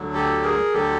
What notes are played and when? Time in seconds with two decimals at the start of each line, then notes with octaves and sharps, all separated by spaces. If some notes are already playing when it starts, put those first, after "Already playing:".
Already playing: D2 D3 F#3
0.13 G4 A4
0.43 G#4 A#4
0.73 D2 D3 F#3 G4 A4